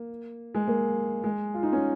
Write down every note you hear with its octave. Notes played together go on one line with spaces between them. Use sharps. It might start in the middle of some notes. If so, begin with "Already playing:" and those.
Already playing: A#3
G#3
A#3
G#3
F4
D#4
C#4